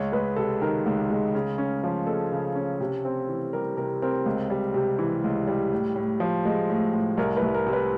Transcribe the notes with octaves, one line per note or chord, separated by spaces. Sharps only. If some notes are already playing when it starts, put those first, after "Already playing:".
Already playing: C#2 C#5
G#3 B4
C3 A4
D#3 A#4
C#2
G#3
C#3
C#4
F3
G#3 A4
C#3
C#4
C3
C4
E3
G3 A#4
C3 A#4
C4 A#4
C#2
G3
C3
E3
C#2
G3
A2
A2
F3
G#3
A2
A2
C2 A#4
B4
C2
A#4
C3
B4